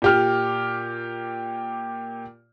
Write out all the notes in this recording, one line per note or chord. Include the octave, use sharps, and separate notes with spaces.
A#2 G4 F6